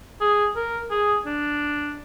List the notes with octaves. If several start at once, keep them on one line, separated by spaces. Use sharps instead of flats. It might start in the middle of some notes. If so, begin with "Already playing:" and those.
G#4
A#4
G#4
D4